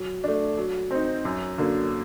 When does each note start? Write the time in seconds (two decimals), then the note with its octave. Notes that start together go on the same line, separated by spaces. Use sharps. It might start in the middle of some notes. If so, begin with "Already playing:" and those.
Already playing: F#3
0.24 A3 D4
0.58 F#3
0.91 C4 D#4
1.25 F#2
1.58 D3 F#3 A#3